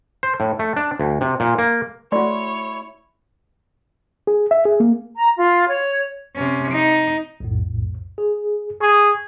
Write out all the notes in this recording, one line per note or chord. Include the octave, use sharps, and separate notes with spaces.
C5
A2
A3
D4
D2
C3
A#2
A#3
A3 E4 F#4 C#5 D5 C6
G#4
E5
G#4
A#3
A#5
F4
C#5
C3 C#4
D#4
B1 F2 A2
G#4
G#4 C#6